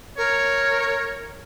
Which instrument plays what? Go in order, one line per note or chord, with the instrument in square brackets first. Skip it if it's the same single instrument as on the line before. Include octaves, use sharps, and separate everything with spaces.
[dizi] A#4 [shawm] C#5